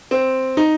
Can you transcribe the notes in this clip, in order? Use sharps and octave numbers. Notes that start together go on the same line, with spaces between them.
C4
D#4